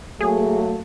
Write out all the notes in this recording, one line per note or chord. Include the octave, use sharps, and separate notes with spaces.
F#3 A3 A#3 G#4